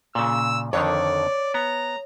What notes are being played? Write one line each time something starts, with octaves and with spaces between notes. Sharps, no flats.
A#2 C#3 E6
F2 D3 D#3 C#5 D5
B3 A#5